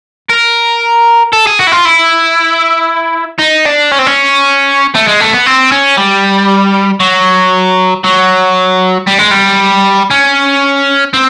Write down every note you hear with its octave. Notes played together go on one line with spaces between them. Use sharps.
A#4
A4
G#4
F#4
E4
F4
E4
D#4
D4
C#4
C4
C#4
A3
G#3
A3
B3
C4
C#4
G3
F#3
F#3
G3
G#3
G3
C#4
C4